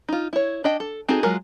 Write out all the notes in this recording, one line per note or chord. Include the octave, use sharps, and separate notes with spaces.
D#4 F4
E4 C#5
D4 D#5 G5
A4
C4 D#4 F#4 G#4 A4
F#3 G#3 F4 A#4